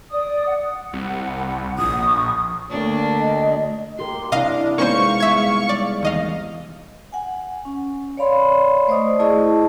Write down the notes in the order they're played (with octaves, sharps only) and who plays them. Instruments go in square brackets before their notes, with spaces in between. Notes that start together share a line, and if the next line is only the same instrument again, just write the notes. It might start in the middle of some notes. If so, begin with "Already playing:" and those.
[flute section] D5 D#6
F#5
[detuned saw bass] C2
[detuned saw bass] A#1 [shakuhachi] D#6
[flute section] C#6
[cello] D2 [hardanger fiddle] A#3 D4
[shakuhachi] D#5
[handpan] G4 A#4 [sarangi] C6
[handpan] C3 E4 [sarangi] D4 [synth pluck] D#5 F5
[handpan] G#3 B3 D#4 [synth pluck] A#3 C#4 C5 [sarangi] F5 [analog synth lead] C#6
[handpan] G3 G#3 [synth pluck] E5 G#6
[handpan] G3 [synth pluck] D5
[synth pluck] D#2 D#5 F5 [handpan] E3
[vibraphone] F#5 G#5
C#4
C#5 D5 F5 B5 C6
A3 C5 D5 D#5 C#6 D#6
A3 E4 G#4 D#5 A5 C#6